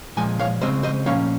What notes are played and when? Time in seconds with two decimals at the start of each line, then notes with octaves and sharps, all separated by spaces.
0.17 A#2 F3 G#3 G#5
0.39 C#5 F5
0.61 C#3 G#3 C4 C5 D#5
0.83 C5 D#5
1.06 A#2 F3 A#3 C#4 C#5 F5